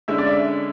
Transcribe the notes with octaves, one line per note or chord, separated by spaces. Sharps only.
D3 G#3 C#4 E4 E5
D5
E5